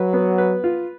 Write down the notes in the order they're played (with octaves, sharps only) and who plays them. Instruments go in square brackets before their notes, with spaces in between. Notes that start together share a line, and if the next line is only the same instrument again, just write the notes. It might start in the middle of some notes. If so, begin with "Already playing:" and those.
Already playing: [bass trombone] F#3 [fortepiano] B4
[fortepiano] B3
B4
F4